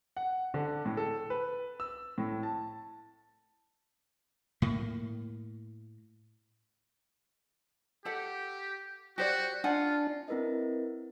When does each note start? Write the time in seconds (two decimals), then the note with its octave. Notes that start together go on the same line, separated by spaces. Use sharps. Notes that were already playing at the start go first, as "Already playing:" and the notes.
0.17 F#5
0.54 D3
0.86 A2
0.97 A4
1.30 B4
1.80 E6
2.18 A2
2.43 A5
4.62 A2 A#3
8.05 G4 A4 F#5
9.18 F#4 G4 C5 D5
9.64 D4 F4 F#5 G#5
10.28 C4 E4 A#4 B4 D#5